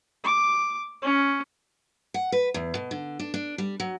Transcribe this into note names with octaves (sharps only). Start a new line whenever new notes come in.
D6
C#4
F#5
B4
E2
B2
D3
D4
D4
G3
F#3